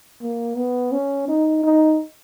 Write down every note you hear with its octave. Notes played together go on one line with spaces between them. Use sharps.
A#3
B3
C#4
D#4
D#4